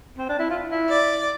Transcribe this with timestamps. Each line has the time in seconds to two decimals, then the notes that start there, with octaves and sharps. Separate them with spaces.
0.18 C4
0.29 D4
0.39 E4
0.50 F4
0.70 E4
0.90 D5